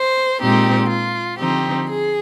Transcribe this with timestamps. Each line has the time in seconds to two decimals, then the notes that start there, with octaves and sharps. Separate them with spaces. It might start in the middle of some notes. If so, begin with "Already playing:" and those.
Already playing: C5
0.39 A#2 G#3 C4 D#4 G4
0.88 F4
1.38 D3 F3 C4 D#4 G4
1.88 G#4